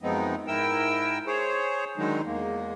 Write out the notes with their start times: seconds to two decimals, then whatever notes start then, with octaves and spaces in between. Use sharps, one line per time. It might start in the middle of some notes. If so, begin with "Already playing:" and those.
0.03 F#2 F3 G#3 B3 C4 D#4
0.47 G#2 E4 A#4 G5 E6
1.26 G#4 C5 C#5
1.97 D3 D#3 F#3 G#3 D#4
2.26 E2 G#3 A#3